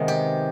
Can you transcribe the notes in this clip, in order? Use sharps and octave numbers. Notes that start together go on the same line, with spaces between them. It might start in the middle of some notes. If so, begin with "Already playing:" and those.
Already playing: C3 D#3 G#3 B3
G4